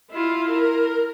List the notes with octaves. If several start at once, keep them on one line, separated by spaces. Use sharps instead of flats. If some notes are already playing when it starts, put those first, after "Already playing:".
E4 F4
A#4